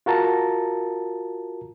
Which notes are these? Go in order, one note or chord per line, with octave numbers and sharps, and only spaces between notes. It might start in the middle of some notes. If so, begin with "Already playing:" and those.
F4 F#4 A#4 A5 A#5